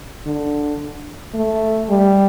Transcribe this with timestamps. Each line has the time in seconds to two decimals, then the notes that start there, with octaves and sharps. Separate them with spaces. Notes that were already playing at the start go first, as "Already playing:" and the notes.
0.26 D3
1.35 A3
1.89 G3